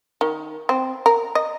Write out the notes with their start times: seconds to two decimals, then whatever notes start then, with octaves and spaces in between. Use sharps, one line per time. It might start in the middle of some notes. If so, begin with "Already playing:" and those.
0.21 D#3
0.69 C4
1.06 A#4
1.35 D#5